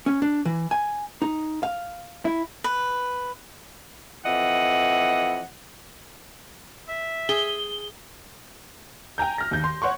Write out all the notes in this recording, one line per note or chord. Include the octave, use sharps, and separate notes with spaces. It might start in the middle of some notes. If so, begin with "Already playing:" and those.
C#4
D4
E3
G#5
D#4
F5
E4
B4
F2 E3 D#5 F#5
E5
G#4 G7
G5 G#5 A#5 G6
F6 A#6
D#2 G6
C6
C#5 F#5 C6 C#6